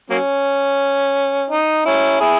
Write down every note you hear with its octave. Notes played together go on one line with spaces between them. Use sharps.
F#3 A#3 C#4
D#4
C#4 E4
E4 G#4